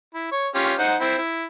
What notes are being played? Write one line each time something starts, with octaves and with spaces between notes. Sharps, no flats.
E4
C#5
C#4 F4 G4
D#4 C5 F#5
C4 E4 C5
E4